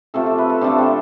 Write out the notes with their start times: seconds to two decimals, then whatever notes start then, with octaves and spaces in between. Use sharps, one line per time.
0.14 C3 F3 A3 A4
0.26 A4
0.38 B4
0.50 A4
0.61 C3 F3 A3 D4
0.78 C4